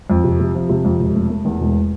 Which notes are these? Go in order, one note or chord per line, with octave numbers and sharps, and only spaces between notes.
F2
C3
C3
F3
C3
F2
E1
A3
A3
E2
E1